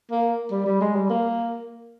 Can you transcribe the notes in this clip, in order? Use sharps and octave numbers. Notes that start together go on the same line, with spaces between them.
A#3
G3
G3
G#3
G3
A#3